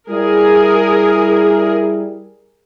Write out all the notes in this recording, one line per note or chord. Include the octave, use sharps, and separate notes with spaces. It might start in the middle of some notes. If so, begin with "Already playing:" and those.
G3 E4 G#4 A#4